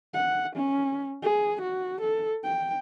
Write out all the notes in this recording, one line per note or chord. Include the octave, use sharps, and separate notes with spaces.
F#5
C#4
G#4
F#4
A4
G5